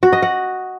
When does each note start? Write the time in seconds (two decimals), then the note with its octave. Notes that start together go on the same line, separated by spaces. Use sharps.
0.03 F#4
0.13 D#5
0.22 F#5